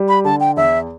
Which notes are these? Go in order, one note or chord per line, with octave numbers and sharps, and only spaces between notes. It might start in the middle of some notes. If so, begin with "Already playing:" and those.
Already playing: G3
B5
D3 A5
G5
E2 E5